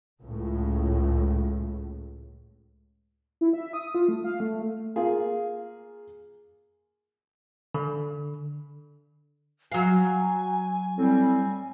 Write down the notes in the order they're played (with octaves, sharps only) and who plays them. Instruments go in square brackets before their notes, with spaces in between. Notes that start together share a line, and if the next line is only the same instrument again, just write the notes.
[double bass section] C#2 A2
[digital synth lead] E4
E5
D#6
F4
A3
F5
A3
[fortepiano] A#3 F4 G#4
[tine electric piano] D3
[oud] F#3 F5 [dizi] G#5
[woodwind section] A2 G3 C4